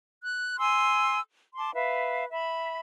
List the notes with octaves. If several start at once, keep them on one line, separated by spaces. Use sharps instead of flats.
F#6
G#5 C6 E6
A5 C6 D6
B4 E5 F5
E5 B5